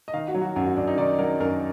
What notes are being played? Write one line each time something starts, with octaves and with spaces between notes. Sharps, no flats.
D#5
D#3 F5
F#4
F#3
F#4
F#2 F#4
F#4
F#2 D4
D#4
D#3 D5
F#3 A#4
F#2 A#4